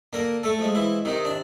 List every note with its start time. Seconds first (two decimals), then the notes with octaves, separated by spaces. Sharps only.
0.13 D3 A#3 A#4
0.43 A3 A4
0.59 F3 G#3
0.75 E3 E4
1.05 C3 D#3 D#4
1.25 D4